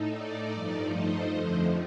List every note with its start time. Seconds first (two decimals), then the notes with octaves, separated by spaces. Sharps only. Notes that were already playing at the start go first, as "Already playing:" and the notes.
Already playing: A2 A3 D#4
0.13 D5
0.51 G2 F3 A3 D#4
0.89 C5 D#5
1.28 F2 D3 F3 A3